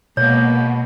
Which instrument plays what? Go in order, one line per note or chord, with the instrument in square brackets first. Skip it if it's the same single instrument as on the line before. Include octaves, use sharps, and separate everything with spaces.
[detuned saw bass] B2 [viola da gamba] G#3 A#3 B3 [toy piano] C#5